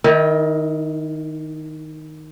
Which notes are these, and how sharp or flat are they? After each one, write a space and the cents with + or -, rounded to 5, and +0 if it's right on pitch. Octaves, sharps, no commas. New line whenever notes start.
D#3 +0 E4 -30 D#5 +0